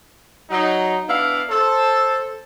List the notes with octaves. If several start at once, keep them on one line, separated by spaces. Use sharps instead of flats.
F#3 D#4
B3 D4 E4 F5
A4 C5